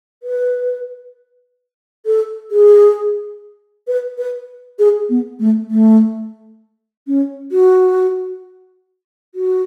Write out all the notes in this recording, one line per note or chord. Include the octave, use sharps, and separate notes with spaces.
B4
A4
G#4
B4
B4
G#4
B3
A3
A3
C#4
F#4
F#4